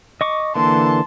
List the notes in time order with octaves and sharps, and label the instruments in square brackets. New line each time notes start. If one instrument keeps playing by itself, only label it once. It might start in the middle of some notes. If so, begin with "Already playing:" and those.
[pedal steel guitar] D#5 C#6 D6
[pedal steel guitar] D3 E3 A#3 [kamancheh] A5 C6